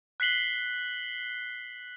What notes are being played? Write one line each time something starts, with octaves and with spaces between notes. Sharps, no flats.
F#6 B6 C7 F#7 G7